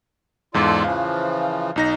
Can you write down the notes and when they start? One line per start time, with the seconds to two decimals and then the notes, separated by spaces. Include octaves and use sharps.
0.54 E2 G#2 F4 A4 D5
0.84 C#3 E3 F3 F5
1.76 B1 D#4 A#6